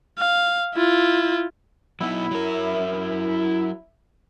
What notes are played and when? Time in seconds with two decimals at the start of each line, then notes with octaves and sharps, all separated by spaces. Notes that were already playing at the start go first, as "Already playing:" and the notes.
0.19 F5
0.75 E4 F4
2.00 F#3 B3 D#4 E4
2.31 F#3 A#4